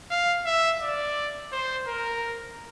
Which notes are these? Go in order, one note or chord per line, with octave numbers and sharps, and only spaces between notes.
F5
E5
D5
C5
A#4